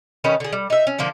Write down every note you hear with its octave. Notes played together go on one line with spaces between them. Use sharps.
D#3 G3 C#4 B4
D3 G#4
G3
D#4 E5
C#4
D3 F3 A#3 D4